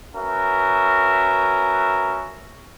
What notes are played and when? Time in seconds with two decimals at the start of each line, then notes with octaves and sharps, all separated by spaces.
0.15 C#4 F#4 A#4 B4 E5